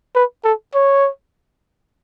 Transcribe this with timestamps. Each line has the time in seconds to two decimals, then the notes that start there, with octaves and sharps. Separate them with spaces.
0.15 B4
0.44 A4
0.74 C#5